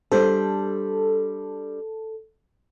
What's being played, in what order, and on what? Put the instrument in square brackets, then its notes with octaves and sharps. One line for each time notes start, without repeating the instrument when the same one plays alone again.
[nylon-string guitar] G3 D4 C5 [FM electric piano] A4